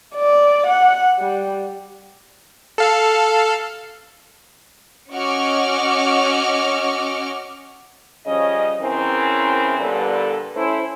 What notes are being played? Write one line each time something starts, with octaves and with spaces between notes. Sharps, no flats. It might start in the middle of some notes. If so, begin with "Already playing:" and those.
D5
F#5
G3
A4 F5
C#4 F#4 D#5 C#6 D6 F6
C#3 F3 G3 C#4 D#5
C#3 E3 C4 C#4 E4 A#4
A#2 D3 G3 B3 A4 B4
A3 C#4 E4 C5